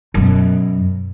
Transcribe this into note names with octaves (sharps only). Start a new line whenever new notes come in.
F#2 B2